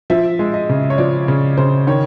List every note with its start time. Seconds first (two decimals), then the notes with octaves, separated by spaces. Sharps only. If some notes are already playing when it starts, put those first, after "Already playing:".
0.10 F3 E5
0.39 G#3
0.54 D#5
0.69 C#3
0.90 C#5
0.98 F3 D5
1.28 C#3
1.57 C#3 C5
1.87 D#3 C#5